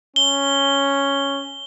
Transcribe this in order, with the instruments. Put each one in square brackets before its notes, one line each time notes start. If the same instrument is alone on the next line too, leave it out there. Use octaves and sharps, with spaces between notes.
[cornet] C#4 [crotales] G7